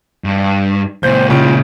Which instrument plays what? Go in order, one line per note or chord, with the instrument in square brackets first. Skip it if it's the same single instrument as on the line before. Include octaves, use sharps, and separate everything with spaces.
[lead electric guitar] G2
[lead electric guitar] C#2 A#2 [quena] C5 [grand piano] G6
[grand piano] C#3 [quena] F4